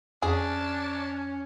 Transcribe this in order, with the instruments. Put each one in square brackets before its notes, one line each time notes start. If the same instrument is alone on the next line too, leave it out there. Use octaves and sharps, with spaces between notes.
[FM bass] F2 [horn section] C#4 [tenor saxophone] D4 [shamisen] G#4